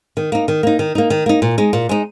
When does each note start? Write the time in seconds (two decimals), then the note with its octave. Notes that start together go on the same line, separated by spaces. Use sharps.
0.17 D#3
0.32 A#3 D#4
0.48 D#3
0.63 A#3 D#4
0.79 D#3
0.95 A#3 D#4
1.10 D#3
1.26 A#3 D#4
1.42 A#2
1.58 G#3 D#4
1.73 A#2
1.89 G#3 D#4